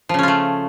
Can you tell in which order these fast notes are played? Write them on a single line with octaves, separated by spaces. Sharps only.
F3 C#3 C#4 F4 A3